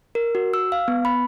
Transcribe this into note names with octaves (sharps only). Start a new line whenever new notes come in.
A#4
F#4
E6
F5
B3
B5